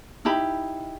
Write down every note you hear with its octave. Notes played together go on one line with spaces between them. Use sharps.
D#4 E4 G4 B5